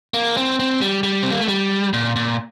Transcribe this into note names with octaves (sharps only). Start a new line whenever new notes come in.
A#3
C4
C4
G3
G3
C4
A#3
A3
G3
A#2
A#2